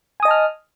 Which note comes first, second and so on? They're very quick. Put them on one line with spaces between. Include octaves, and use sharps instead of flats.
G#5 D#6 D#5 A5 F6